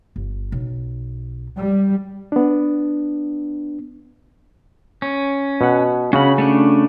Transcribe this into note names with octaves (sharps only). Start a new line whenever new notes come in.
G1
B1
G3
B3 D4
C#4
B2 F#5
C#3 C#4 F#4 B5
A3 C#4 D4